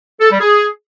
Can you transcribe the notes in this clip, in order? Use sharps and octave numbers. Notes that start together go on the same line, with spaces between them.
A4
G3
G#4